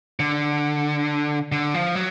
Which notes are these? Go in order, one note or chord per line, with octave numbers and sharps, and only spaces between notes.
D3
D3
F3
F#3